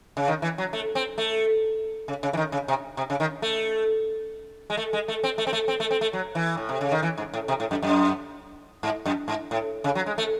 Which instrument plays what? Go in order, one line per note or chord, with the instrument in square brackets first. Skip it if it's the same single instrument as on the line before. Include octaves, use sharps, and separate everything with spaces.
[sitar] C#3
D#3
E3
F#3
A3
C4
A3
C#3
C#3
E3
D#3
C#3
C3
C3
C#3
D#3
A3
G#3
A3
G#3
A3
C4
A3
C4
A3
C4
A3
C4
A3
F#3
E3
A2
C3
C#3
D#3
E3
G#2
A2
C3
A2
F#2
F#2
G#2
F#2
G#2
A2
C#3
F#3
G#3
A3